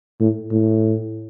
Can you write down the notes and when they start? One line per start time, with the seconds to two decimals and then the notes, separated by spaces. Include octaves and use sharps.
0.20 A2
0.51 A2